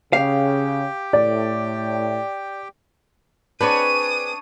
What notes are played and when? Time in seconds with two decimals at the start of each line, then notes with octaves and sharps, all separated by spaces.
0.13 C#3 G4 F5 G5
1.13 A2 D5
3.60 C4 D4 G#4 B4 C#5 C#6 D#6 D#7